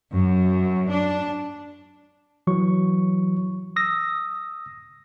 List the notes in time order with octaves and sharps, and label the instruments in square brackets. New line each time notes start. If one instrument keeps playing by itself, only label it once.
[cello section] F#2
D4
[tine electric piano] E3 F#3 C#6
D#6 E6 A#6